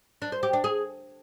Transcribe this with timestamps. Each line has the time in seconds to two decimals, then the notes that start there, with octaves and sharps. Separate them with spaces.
0.22 D4
0.32 C5
0.43 G4
0.53 D4
0.64 G#4